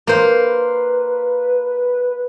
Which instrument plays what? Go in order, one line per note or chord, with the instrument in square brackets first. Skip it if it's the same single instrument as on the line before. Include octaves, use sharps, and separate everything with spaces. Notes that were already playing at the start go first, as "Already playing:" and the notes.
[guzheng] A#3 C5 [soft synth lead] B4